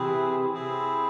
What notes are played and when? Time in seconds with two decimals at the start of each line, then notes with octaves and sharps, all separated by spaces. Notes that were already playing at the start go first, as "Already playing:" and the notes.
Already playing: C3 E3 C4 E4 G#4
0.53 C4 E4 G#4